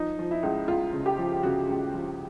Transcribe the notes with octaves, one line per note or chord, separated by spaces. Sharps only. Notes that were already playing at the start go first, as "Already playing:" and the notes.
Already playing: F3 D#4
F3
E4
C#2
C#2 F4
C#3
G4
F3
C#3 F#4
C#2
F3